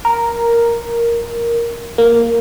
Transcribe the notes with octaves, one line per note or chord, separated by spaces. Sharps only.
A#4
A#3